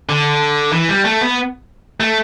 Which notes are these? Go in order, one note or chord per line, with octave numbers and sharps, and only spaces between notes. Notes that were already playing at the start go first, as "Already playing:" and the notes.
D3
E3
G3
A3
B3
A3